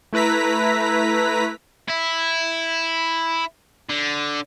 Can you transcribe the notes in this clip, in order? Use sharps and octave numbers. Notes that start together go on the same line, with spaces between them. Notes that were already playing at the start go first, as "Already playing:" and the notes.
A3 E4 B4 A#5 B6
E4
D3